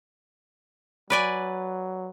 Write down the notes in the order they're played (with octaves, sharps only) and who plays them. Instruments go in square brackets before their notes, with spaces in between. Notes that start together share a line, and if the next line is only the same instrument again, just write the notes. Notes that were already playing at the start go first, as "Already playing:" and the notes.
[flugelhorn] F#3 [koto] B4 D5 G#5